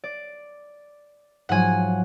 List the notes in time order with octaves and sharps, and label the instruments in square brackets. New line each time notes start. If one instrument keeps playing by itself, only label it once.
[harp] D5
[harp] G#2 F3 F#3 [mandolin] F#5 G#5